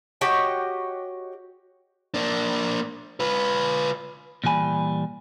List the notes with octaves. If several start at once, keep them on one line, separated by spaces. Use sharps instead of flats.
F#4 G4 C#5 D#5
A#3 D4
F4 B4
A#2 E3 G3 G#5 B5